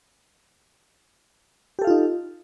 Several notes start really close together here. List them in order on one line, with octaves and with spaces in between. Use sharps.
G4 A4 F5 F4 D#4